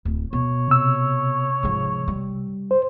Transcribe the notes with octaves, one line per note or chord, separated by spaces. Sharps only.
D1
B2 C#5
C3 E6
G#2 F3
G3
C5